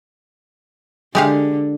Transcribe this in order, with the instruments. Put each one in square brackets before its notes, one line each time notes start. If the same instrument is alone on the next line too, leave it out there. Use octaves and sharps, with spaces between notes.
[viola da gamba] D3 [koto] G#3 G4 F5